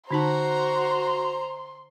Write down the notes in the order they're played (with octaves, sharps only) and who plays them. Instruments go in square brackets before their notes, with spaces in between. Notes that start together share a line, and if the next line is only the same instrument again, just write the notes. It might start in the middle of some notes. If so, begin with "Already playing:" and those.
[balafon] D3 D#4 A5 [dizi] F#4 [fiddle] C5 A#5 [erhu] C6